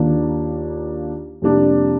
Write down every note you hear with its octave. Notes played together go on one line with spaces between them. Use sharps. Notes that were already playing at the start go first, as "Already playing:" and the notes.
Already playing: D#2 D#3 A#3 D4 F4
F2 C3 G3 A#3 D4